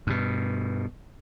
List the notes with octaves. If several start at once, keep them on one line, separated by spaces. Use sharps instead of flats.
G2 B2